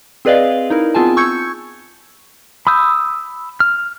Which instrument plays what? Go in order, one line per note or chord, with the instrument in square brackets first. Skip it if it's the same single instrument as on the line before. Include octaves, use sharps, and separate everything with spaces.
[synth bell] C4 G#4 B4 D5 D#5 F5
D#4 E4 A#4
B3 C4 F4 G#4 G#5 A5
C#6 E6 G6 G#6 C#7
[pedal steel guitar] B5 D#6 E6 G6
F6